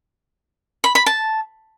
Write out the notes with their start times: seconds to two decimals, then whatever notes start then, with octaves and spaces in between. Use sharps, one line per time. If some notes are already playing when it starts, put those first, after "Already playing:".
0.84 B5
0.95 B5
1.06 A5